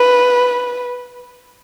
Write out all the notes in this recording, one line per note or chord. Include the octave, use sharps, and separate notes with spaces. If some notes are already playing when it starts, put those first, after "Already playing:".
Already playing: B4